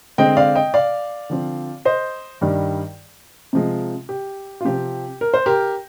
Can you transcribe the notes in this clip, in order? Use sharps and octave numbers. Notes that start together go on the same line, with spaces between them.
D3 G#3 C4 D#5 G5
D5 F5
D#5 G5
D5 F5
D3 F3 C4
C5 D#5
G2 D#3 G3
C3 F3 G#3
G4
F4
C3 F3 C4 G4
A#4
C5
G4 A#4